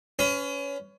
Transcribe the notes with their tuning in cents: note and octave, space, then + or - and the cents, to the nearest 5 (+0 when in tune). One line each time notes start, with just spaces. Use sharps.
C#4 +20 B4 +40